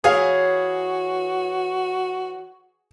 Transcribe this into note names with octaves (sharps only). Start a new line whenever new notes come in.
E3 F#4 G#4 C#5 F5